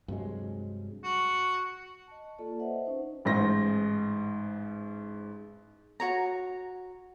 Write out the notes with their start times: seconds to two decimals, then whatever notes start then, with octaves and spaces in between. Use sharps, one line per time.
0.08 G2 C3 F#3 G#3
1.04 F#4
2.07 D#5 A5
2.39 A#3 F4 A4 D5 A5
2.60 B4 C5 D#5 E5 F#5
2.85 C#4 D#4 C5
3.25 A1 G#2 C5 A#6
6.00 F#4 C#5 A#5